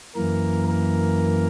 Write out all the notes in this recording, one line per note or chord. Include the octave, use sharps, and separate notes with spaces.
F#2 E3 A#3 A#4
A#4